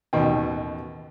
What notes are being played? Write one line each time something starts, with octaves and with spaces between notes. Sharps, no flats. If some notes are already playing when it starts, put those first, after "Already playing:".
A1 D#2 B2 G5